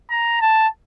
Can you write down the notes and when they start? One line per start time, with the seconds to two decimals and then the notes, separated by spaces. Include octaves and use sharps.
0.11 A#5
0.42 A5